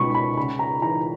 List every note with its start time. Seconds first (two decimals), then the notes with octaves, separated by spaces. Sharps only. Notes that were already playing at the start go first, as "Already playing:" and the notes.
Already playing: C#2 B2 B5 C#6
0.15 B5
0.37 C#3 B5
0.59 A#5
0.82 E3 A#5